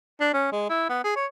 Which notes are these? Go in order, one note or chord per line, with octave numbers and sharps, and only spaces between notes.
D4
C#4
G#3
E4
B3
G#4
C#5